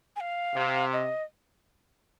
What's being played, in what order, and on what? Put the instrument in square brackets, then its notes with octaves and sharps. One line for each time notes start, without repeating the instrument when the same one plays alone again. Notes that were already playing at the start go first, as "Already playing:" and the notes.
[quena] G#5
F5
[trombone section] C3
[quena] D#5